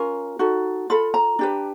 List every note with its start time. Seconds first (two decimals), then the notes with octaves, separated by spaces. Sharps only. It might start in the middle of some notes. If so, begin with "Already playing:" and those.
Already playing: C#4 F4 A#4
0.39 D#4 F#4 A4
0.90 F4 A4 B5
1.14 A#5
1.39 D4 G4 B4